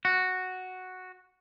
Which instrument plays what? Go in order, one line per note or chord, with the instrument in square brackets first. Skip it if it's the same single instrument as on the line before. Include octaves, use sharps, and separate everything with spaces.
[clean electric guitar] F#4